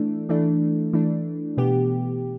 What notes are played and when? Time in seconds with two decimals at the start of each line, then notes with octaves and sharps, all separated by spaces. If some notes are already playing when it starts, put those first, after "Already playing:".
Already playing: E3 A3 D4
0.29 E3 A3 D4
0.93 E3 A3 D4
1.57 B2 B3 G4